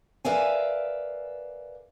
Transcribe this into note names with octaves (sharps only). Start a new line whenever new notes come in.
A#4 B4 D5 E5 F5 G#5